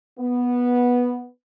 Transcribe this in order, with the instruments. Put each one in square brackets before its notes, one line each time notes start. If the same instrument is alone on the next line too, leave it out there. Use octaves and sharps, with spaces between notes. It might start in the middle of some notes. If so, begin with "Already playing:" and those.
[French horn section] B3